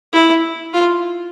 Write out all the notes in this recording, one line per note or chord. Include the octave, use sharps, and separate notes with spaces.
E4
F4